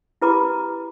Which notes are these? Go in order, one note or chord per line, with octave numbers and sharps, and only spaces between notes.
E4 G4 B4 A#5 B5 D6